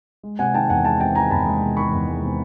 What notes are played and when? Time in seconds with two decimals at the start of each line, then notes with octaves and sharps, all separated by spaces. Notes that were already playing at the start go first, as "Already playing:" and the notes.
0.23 G#3
0.39 C3 F#5 G#5
0.54 D#3 G5 A5
0.70 E2 F#5 G#5
0.85 G#3 G5 A5
1.00 C3 G5 A5
1.15 D#3 G#5 A#5
1.31 E2 A5 B5
1.46 G#3
1.62 C3
1.77 D#3 B5 C#6
1.92 E2
2.07 G#3
2.23 C3